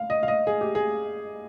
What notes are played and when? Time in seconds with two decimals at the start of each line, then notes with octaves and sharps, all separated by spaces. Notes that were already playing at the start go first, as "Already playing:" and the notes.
Already playing: F5
0.10 D#5
0.23 F5
0.28 D#5
0.47 G#4
0.61 G4
0.75 G#4